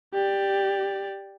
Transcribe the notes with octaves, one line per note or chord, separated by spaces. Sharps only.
G4 D5